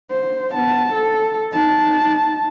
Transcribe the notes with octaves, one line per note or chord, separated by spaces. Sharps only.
C5
B3 A5
A4
D#4 A5